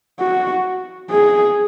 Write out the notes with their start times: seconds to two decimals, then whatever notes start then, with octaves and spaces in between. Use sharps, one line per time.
0.19 F#4
1.10 G#4